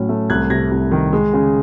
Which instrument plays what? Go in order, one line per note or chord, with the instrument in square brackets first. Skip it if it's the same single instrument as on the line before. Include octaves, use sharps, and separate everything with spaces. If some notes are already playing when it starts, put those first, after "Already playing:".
Already playing: [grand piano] A2 F#3 C#4
A3
C2 F#6 G#6
C3 G#6 A#6
C2
D#3
G#3
C#3